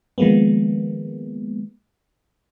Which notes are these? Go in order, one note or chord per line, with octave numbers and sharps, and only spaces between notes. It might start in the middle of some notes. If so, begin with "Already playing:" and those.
D#3 F3 G#3 A#3 B3